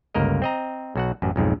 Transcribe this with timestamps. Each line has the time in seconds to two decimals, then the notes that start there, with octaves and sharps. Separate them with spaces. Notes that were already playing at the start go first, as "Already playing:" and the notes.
0.14 G1 C#2 A#3 A#4 D#5
0.42 C4 D#5 A#5
0.95 B1 F#4 F#5
1.22 A1 F#2
1.36 B1 F2 G#2